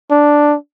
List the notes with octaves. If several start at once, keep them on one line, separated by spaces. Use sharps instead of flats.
D4